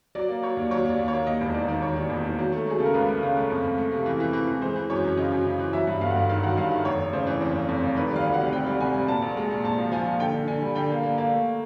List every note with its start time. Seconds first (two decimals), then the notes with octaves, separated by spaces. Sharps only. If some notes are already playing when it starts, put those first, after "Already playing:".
0.15 F#3 D5
0.29 A#3
0.42 F#3 C#5
0.57 D#2
0.71 F#3 C#5
0.84 D#2
0.90 D5
0.99 D#2
1.08 A#3 C#5
1.27 D#2 D#5
1.41 E1
1.54 D#3 D5
1.68 D#3
1.82 E1 C#5
1.96 D#3
2.10 E1
2.25 D#3
2.39 F#3
2.52 A3
2.66 F#3 G#4
2.78 C#3 A4
2.86 A#4
2.94 C#2 B4
3.08 A3
3.22 C#3
3.36 A3
3.50 F2
3.64 F2
3.78 A3
3.92 C3
4.06 E3
4.20 E3
4.33 E3
4.48 E3
4.62 G#3 C5
4.76 E3
4.90 F#2 C#5
5.04 F#2
5.17 C#3 D#5
5.31 F#2
5.46 C#3
5.59 E3
5.73 F#3 E5
5.87 G2
6.01 G1 F5
6.10 F#5
6.15 G1 F5
6.29 D#3 F5
6.43 F#3 F#5
6.57 G2 F5
6.71 D#3
6.85 F1 C#5
6.99 F1
7.13 C#3 C5
7.27 E3
7.41 F2
7.55 F2
7.68 F2
7.83 F1
7.96 D#3 B4
8.10 G3
8.16 F5
8.25 D2
8.34 F#5
8.39 C3
8.52 C3 G5
8.66 G3
8.80 C3 G#5
8.94 G3
9.08 A#2 A5
9.22 A#1
9.37 G#3
9.50 A#2
9.64 A#1 A5
9.78 F3
9.92 F3 G#5
10.06 A#2
10.20 D3 G5
10.34 D3
10.48 D3 G#5
10.61 G3
10.75 D3 G5
10.90 A#3
11.03 A#3
11.18 A#3
11.32 A3